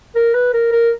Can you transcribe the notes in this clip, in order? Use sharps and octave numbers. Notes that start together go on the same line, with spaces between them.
A#4
B4
A#4
A#4